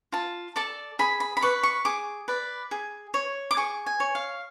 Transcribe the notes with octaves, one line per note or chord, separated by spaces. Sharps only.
F4 A5
A4 D5 A5
G#4 B5
B5
B5
B4 D5 C#6
C#6
G#4 D6
B4 D5
G#4
C#5
D6
G#4 C#6
G#5
C#5
F5